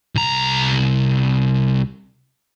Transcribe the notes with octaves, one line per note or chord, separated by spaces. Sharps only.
C2 A#5